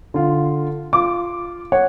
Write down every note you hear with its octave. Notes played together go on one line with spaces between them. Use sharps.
D3 F4
F4 D6
C#5 F#5